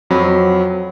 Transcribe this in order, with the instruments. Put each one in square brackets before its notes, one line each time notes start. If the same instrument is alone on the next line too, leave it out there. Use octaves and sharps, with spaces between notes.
[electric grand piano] F2 F#3 C4 B5